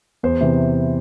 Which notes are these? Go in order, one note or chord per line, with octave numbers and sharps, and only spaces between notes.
E2 C5
C3 E3